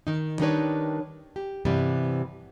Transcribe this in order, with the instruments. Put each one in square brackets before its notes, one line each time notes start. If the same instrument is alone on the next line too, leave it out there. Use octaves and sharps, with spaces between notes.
[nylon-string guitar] D#3 D#4
D#3 G3 D4 D#4 B4 C#5
G4
G2 C3 E3 G3 B3